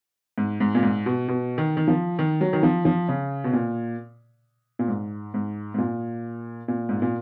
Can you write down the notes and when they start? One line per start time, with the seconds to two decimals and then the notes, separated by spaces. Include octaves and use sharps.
0.38 G#2
0.60 G#2
0.75 A#2
0.83 G#2
1.06 B2
1.28 B2
1.58 D#3
1.77 D#3
1.88 F3
2.19 D#3
2.41 F#3
2.53 D#3
2.63 F3
2.85 F3
3.09 C#3
3.44 B2
3.53 A#2
4.79 A#2
4.88 G#2
5.34 G#2
5.74 G#2
5.78 A#2
6.68 A#2
6.89 G#2
7.02 A#2